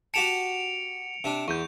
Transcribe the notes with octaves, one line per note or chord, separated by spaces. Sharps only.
F#4 G4 A5 C#7 D7 F7
C3 D4
E2 C#6 G6